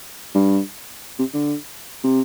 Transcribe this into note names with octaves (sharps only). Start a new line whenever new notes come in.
G2
C3
D3
C3